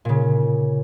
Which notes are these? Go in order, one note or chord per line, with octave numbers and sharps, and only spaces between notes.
A#2 C#3